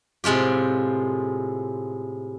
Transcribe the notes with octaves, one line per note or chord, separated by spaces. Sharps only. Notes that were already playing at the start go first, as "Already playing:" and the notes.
A2 C3 G#3 F4 G4